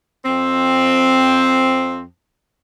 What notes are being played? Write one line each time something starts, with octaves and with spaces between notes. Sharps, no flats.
F2 C4